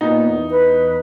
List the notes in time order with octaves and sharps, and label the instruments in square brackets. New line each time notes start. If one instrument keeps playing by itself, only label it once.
[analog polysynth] A#2 A#3 B3 [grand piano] D#4
[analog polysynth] E2
[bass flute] B4